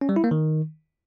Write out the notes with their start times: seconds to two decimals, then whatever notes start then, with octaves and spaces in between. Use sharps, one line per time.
0.01 C#4
0.09 G3
0.16 E4
0.24 A#3
0.31 D#3